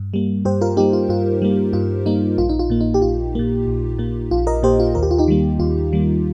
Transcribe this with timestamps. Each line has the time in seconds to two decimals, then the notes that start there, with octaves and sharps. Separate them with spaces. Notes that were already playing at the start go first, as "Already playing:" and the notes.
Already playing: G2
0.14 G3 A#3
0.45 G2 G4 C5
0.61 F4 A#4
0.77 A#3 D#4 G4
0.80 G3
0.93 F4
1.09 G2 F4
1.42 G3 A#3
1.73 G2 F4
2.06 G3 A#3 D#4
2.38 A#1 F4
2.49 D#4
2.59 F4
2.70 A#2 A#3
2.81 D#4
2.94 G4
3.02 A#1 F4
3.35 A#2 A#3
3.67 A#1
3.98 A#2 A#3
4.31 A#1 F4
4.47 A#4 D#5
4.63 A#2 A#3 G4 C5
4.80 F4
4.95 D#2 A#4
5.03 G4
5.11 F4
5.18 D#4 G4
5.28 D#3 G3 A#3
5.59 D#2 F4
5.93 D#3 G3 A#3